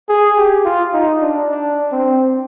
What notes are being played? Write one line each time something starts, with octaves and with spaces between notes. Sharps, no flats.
G#4
G4
F4
D#4
D4
D4
C4